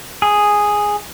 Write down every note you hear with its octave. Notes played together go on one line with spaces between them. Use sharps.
G#4